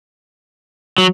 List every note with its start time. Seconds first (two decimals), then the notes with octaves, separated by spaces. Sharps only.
0.98 F#3